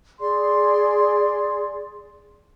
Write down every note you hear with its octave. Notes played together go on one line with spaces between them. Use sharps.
G#4 D5 C6